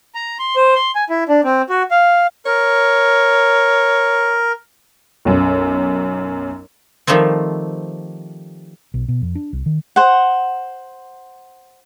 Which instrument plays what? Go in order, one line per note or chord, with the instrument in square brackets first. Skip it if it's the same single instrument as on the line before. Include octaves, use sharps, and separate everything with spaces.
[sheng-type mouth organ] A#5
C6
C5
C6
G#5
E4
D4
C4
F#4
F5
[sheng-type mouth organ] A#4 [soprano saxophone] C#5
[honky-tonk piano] B1 F#2
[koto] D#3 F3 G3 A3 C4
[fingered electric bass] B1
B2
F2
D4
C2
D#3
[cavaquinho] C5 F#5